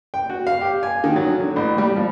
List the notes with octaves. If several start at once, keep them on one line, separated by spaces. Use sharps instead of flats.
G5
F#4
F5
G4
G#5
D#3
F#3
D3
A1
G3
F3